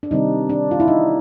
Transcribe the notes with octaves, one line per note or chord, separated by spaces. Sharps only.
D4
C3 D#3 G3 C4 D#4
D4
F4
E4
D#4